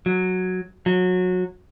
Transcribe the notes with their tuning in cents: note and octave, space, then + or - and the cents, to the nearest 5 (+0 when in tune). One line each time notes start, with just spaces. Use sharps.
F#3 -5
F#3 -20